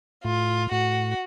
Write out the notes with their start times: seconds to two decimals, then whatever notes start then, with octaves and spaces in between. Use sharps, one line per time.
0.24 A2 F4
0.72 A2 F#4